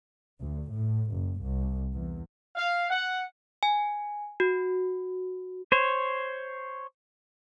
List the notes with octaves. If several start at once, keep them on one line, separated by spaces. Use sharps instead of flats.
D2
A2
F#1
C2
E2
F5
F#5
G#5
F#4
C5 C#5